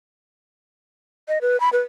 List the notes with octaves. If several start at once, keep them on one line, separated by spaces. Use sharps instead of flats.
D#5
B4
B5
B4